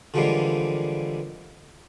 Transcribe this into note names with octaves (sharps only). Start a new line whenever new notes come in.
D3 E3 F3 G3 G#3 A#3